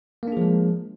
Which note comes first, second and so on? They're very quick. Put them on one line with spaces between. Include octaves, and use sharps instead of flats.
A#3 D4 G#4 F3 G#3